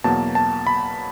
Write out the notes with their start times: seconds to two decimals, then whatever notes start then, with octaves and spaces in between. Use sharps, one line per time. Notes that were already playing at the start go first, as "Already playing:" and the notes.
0.04 E2 B2 F#3 A#3 A5
0.35 A5
0.67 B5